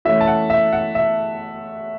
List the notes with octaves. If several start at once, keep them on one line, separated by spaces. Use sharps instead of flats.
E3 A3 C#4 E5
A5
F#5
E5
F#5
E5